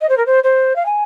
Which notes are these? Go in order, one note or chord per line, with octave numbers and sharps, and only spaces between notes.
D#5
C5
A#4
C5
C5
F5
G#5